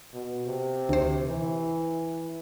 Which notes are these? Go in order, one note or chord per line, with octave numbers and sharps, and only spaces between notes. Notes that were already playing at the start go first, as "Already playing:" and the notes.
B2
C3
D2 C5
E3